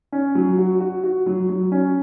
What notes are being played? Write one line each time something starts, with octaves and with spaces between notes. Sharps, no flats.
C#4
F#3
F#4
F#4
F#4
F#3
F#3
C#4